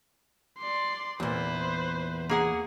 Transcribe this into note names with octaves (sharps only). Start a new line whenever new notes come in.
D5 C6
E2 A#2 B4 C5
A#3 G#4 F#5